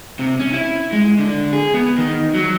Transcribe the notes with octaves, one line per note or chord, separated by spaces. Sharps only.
C3
C#4
E4
G#3
D3
G#4
B3
D#3
F#3